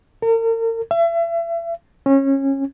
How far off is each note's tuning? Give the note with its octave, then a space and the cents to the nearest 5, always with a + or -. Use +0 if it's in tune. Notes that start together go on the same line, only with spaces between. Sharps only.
A#4 -40
E5 +35
C#4 -25